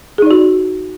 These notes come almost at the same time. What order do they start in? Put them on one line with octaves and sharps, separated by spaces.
G#4 D#4 D5 F#4